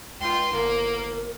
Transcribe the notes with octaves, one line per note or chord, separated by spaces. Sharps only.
C#2 F4 G5 C6
G1 A#3 A#4